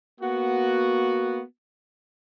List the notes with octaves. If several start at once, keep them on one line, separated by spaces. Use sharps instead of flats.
A#3 B3 F#4